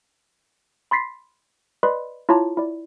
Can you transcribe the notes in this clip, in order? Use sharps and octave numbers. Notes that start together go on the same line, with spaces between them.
B5 C6 A6 B6 C7
B4 D5 D#5 B5 C6
E4 F4 C#5 A5 A#5 D6
E4 D5